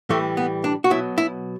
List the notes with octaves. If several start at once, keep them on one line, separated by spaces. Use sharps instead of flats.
A2 E3 G3 A3
B3
D4
F#4
B2 F#3 E4
E4